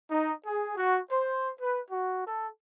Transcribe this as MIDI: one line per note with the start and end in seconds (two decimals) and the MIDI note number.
0.10 0.33 63
0.46 0.73 68
0.77 1.00 66
1.12 1.50 72
1.61 1.80 71
1.91 2.24 66
2.26 2.47 69